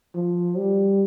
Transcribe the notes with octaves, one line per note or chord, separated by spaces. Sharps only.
F3
G3